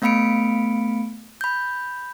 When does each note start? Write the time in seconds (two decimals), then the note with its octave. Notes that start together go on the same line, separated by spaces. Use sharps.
0.02 A3 B3 F5 B5 C#7 D7
1.41 B5 G6